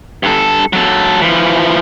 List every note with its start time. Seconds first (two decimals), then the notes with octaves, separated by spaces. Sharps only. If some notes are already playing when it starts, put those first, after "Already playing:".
0.23 G2 A4
0.73 F#3 A4
1.21 E3 F3